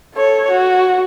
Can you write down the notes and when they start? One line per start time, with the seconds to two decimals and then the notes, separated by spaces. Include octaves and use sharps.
0.15 A4 C#5
0.51 F#4